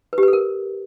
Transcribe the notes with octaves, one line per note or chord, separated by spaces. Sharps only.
B4
G4
B4
A4
A#4